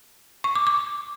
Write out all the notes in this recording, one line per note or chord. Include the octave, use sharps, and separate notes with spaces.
C#6
D6
D6